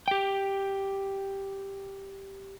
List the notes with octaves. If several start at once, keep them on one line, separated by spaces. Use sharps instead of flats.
G4 G5